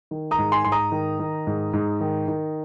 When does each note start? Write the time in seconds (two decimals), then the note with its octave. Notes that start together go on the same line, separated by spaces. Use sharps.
0.11 D#3
0.31 A#5 D#6
0.38 G#2
0.52 G#5 C6
0.65 G#2 C6
0.72 A#5 D#6
0.92 D#3
1.20 D#3
1.47 G#2
1.74 G#2
2.01 D#3
2.28 D#3